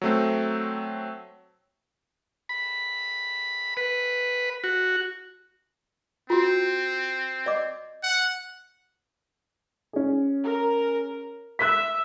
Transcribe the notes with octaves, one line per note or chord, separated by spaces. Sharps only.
F#3 A3 C4
B5
B4
F#4
C4 F4 F#4
D5 D#5 D6
F#5
C#4 G#4
A#4
E5 F#6 B6